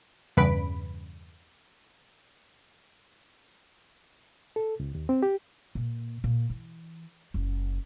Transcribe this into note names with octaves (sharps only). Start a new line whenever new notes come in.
E2 G2 C#3 B4 B5 D7
A4
C#2
D#2
C4
G4
A#2
A#2
E3
F#1